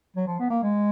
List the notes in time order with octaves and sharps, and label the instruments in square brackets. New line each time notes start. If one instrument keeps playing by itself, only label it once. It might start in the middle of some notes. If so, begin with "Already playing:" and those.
[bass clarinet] F#3
F3
B3
A#3
G#3